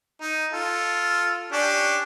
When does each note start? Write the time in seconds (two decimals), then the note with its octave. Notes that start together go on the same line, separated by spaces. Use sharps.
0.21 D#4
0.53 F4 A4
1.52 C#4 D4 G4